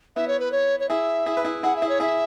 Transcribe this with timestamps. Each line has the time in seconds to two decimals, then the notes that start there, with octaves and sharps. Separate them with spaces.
0.16 B3 E4 E5
0.28 C#5
0.40 B4
0.52 C#5
0.80 C#5
0.89 E4 G#4 E5
1.26 E4 G#4
1.37 B4
1.45 E4 G#4
1.63 E4 G#4 F#5
1.76 E5
1.82 E4 G#4
1.89 C#5
2.00 E4 G#4 E5